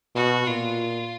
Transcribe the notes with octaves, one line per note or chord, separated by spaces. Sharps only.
B2 F#4
A#2 F4